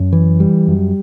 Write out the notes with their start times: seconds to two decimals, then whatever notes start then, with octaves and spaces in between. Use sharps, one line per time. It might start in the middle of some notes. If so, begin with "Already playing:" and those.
Already playing: F#2
0.13 E3
0.40 G3
0.68 F#2